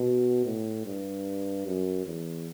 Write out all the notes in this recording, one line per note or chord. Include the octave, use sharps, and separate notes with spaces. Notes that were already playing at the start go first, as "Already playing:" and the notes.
Already playing: B2
A2
G2
F#2
E2